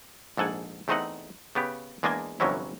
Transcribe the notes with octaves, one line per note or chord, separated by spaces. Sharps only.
A#1 G#2 A4 F#5 G#5
E2 A3 C4 D#4 D#5 F#5
C#3 B3 G4
E2 G#3 A#3 D4 D#5 G#5
G1 F2 C3 F#3 C#4 E4